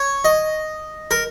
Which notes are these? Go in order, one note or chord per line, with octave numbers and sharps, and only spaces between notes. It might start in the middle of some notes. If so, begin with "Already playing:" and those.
Already playing: C#5
D#5
A#4